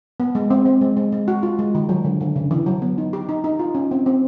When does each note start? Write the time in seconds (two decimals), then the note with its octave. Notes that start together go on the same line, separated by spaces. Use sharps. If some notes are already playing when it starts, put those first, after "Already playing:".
0.20 B3
0.35 G#3
0.50 C4
0.65 C4
0.81 G#3
0.97 G#3
1.12 G#3
1.28 F#4
1.43 F4
1.59 G#3
1.75 D#3
1.89 F#3
2.04 D3
2.21 D3
2.36 C#3
2.51 E3
2.66 F#3
2.82 B3
2.98 D#4
3.13 G4
3.29 D#4
3.44 D#4
3.59 F4
3.75 C#4
3.91 C4
4.06 C4